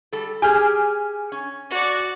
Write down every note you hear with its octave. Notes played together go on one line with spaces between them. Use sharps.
G3 A4
G4 G#4 G#5 F6
C#4
F#4 D5